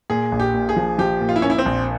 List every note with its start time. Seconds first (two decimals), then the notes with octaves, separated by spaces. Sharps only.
0.10 A#2 G#4
0.32 A#1
0.40 G4
0.54 A#2
0.69 G#4
0.76 F3
0.98 F3 G4
1.21 A#2
1.29 F4
1.36 E4
1.42 A#3 C#4
1.50 E4
1.58 C4
1.66 A#1